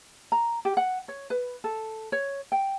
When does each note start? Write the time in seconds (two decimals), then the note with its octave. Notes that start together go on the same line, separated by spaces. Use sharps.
0.32 A#5
0.65 G4
0.77 F#5
1.08 C#5
1.30 B4
1.64 A4
2.12 C#5
2.52 G5